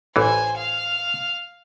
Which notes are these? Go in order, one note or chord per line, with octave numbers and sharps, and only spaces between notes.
A1 E3 C5 G#5
F5